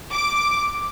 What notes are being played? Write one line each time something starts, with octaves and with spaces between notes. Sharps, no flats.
D6